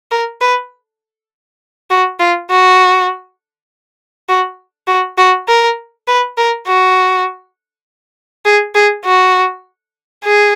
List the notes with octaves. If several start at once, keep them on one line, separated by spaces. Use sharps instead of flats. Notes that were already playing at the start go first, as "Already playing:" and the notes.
A#4
B4
F#4
F4
F#4
F#4
F#4
F#4
A#4
B4
A#4
F#4
G#4
G#4
F#4
G#4